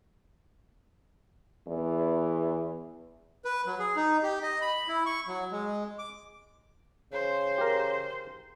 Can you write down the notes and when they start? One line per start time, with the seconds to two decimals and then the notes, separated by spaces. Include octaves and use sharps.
1.68 E2
3.45 B4
3.66 F#3
3.79 G#4
3.96 D#4
4.23 G4
4.43 D#5
4.62 B5
4.88 E4
5.06 C#6
5.27 F#3
5.52 G#3
5.99 D6
7.13 C#3 C5
7.58 G4 A#4